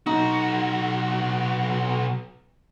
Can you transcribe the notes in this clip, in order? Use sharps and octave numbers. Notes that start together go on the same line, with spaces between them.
B1 D#4 F#4